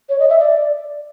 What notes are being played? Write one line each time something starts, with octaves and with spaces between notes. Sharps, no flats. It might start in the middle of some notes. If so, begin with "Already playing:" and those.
C#5
D#5
E5
D5